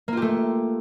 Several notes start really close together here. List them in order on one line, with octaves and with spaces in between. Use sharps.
A#3 F4 G4 A3